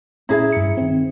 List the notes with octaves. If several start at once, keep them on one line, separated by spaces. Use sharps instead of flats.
A#2 C#4 E4 G#4 E5 A#5
G2 C#7
D#3 C4